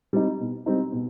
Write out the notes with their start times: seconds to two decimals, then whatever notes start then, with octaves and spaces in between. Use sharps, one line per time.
0.13 G3 C4 D#4
0.40 B2
0.66 G3 C4 D#4
0.93 B2